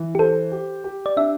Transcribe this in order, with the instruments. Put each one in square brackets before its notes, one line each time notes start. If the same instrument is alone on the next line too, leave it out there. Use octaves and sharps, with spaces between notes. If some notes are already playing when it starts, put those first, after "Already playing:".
Already playing: [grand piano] E3
[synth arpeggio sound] G4
[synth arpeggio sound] A4 [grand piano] C5
[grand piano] G4
G4
[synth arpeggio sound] D5
[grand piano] D4 [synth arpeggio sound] E5